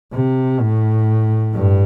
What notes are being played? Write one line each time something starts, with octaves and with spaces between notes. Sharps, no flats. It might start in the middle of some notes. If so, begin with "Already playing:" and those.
C3
A2
G2